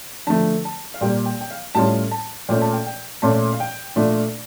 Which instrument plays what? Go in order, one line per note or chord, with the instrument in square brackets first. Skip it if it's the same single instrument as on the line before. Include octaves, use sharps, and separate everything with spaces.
[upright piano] D3 F3 A3 A5
A5
F5
A#2 G3 A#3 G5
G5
G5
F5
A2 G3 C#4 F4 A5
A5
A#2 A3 C#4 F4 G5
A5
G5
G5
A#2 A3 C#4 F4 A5
F5
G5
A#2 A3 D4 F4